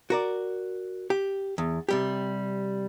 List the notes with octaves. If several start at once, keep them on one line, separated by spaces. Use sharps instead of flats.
F#4 A#4 D5
G4
E2
C3 G3 G4